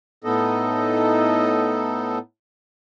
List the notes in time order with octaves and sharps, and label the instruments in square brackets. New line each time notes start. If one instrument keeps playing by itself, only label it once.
[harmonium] A2 B3 D#4 A4 D#5